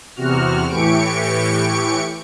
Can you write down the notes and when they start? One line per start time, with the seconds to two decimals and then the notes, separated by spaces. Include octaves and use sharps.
0.16 E2 C3 F#4 F6
0.68 A2 E3 G4 C#6 C#7 D7